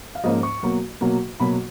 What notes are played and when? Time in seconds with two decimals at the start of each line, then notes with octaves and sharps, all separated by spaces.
0.15 F5
0.24 G#2 F3 A#3 C#4 D#5
0.43 C#6
0.63 B2 F#3 A#3
1.01 B2 F#3 A#3
1.40 B2 F#3 A#3 B5